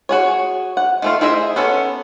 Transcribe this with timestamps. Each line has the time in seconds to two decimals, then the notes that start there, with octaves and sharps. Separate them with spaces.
0.09 F#4 G#4 C#5
0.77 F#5
1.02 D#3 A3 F4
1.21 E4 G#4 C5 D#5 E5
1.56 B3 C#4 A4 C#5